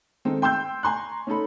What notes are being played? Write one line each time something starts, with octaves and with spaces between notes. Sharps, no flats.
D#3 G#3 C4 D#4 A4
G5 C6 E6 G6
G#5 A#5 C6 C#6 F#6
C#4 D#4 A4 B5